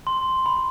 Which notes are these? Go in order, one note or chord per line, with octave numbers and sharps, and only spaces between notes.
C6
B5